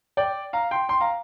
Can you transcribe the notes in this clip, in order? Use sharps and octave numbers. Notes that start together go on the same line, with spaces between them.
D5 G5
F5 A#5
G5 C6
G5 C6
F5 A#5